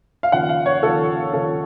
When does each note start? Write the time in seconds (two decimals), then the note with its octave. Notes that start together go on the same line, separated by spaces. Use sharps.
0.23 F5
0.32 D#2 C#3 F3 F#5
0.49 F5
0.66 C#5
0.83 D#2 C#3 F3 A4
1.33 D#2 C#3 F3 A4